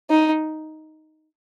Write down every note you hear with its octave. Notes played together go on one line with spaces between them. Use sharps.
D#4